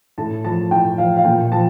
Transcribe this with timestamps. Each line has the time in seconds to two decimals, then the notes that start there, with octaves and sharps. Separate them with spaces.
0.18 A2 A5
0.44 F3 A5
0.71 A2 G5
0.98 F3 F5
1.17 F5
1.25 A#2 G5
1.52 F3 A5